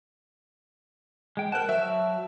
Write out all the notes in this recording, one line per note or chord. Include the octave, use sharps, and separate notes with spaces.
G#3 G5
A#4 C5 F#5 A5 F#6
F#3 E5 A5